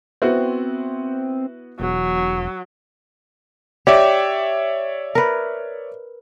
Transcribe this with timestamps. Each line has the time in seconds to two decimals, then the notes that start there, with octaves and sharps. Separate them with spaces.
0.22 B3 C4 E4 F#4
1.80 E1 F#3
3.87 G4 C#5 D5 E5
5.15 A#4 B4